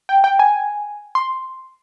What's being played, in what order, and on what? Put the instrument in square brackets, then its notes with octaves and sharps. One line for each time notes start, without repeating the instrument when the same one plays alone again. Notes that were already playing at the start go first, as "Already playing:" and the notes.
[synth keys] G5
G5
G#5
C6